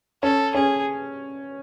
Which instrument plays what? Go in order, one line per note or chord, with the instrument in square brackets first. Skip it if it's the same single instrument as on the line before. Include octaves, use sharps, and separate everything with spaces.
[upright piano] C#4 [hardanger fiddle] A4
[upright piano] C#4 [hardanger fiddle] G#4